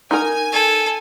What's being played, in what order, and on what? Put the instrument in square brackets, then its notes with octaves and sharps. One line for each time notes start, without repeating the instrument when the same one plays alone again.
[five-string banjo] D#4 A#4 [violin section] G#5
[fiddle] A4